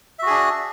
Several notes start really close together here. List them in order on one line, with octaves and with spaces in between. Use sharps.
E5 F#4 G#4 D4